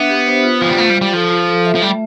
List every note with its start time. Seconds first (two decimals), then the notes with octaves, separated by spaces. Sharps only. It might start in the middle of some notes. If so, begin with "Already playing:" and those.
Already playing: B3 D4 E5
0.09 G4
0.26 C5
0.43 F4
0.61 F3 F4
0.70 G3
0.78 A3 F5
0.90 G3
0.96 F4
1.02 G3
1.13 F3 A4
1.30 F4
1.48 A4
1.65 E5
1.75 F3
1.82 G3 A3